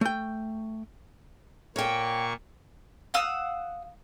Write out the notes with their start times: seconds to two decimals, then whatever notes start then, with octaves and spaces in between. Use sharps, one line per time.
0.01 A3 G5
1.76 A#2 A#3 C#5 G5 C#6
3.14 F5 F#5 D#6 E6